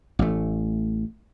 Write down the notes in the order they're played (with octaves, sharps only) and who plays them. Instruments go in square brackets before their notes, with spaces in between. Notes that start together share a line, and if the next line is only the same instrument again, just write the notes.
[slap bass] A1 A3